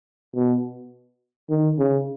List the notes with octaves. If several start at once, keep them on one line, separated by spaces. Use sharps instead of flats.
B2
D#3
C#3